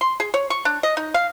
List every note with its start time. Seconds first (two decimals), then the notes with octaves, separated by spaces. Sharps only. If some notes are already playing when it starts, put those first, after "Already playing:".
0.01 C6
0.20 G#4
0.34 C#5
0.50 C#6
0.65 D4
0.83 D#5
0.97 D#4
1.14 F5